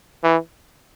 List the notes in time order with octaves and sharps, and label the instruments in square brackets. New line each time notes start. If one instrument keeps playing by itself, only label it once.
[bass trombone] E3